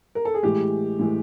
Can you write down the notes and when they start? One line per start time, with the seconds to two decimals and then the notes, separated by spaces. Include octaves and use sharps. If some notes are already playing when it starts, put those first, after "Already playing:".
0.15 A#4
0.25 A4
0.34 G#4
0.43 A2 E3 G#3 G4
0.99 A2 E3 G#3